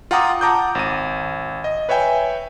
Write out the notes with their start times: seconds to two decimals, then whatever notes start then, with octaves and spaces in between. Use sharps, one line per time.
0.11 F4 F#5 G5 A#5 D6 D#6
0.41 F#5 A5 A#5 D6 D#6 G6
0.75 G#1 D#7
1.64 D#5
1.89 B4 C#5 E5 G5 G#5